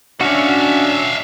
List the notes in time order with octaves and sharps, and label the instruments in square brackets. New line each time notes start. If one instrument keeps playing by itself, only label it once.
[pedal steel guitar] C#4 F#4 [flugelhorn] D4 [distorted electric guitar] E5 F5